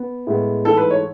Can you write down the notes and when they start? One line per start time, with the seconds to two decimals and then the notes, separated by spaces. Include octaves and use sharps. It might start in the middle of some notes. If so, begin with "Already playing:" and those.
Already playing: B3
0.27 A2 G#3 B3
0.65 G#2 E3 A3 A4
0.77 B4
0.90 C#5